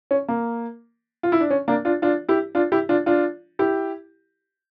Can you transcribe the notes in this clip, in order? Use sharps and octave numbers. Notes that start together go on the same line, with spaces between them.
C#4
A#3
F4
E4
D4
C#4
A#3 D4
D4 F4
D4 F4
E4 G4
D4 F4
E4 G4
D4 F4
D4 F4
E4 G4